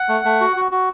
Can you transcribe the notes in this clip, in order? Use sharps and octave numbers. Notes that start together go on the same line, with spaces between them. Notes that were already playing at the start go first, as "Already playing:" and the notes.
Already playing: F#5
A3
A3
F#4
F#4
F#4